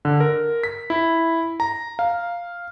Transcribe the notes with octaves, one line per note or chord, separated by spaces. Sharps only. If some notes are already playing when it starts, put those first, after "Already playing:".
D3
A#4
B6
E4
A#5
F5